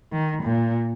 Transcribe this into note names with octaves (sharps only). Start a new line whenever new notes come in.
D#3
A#2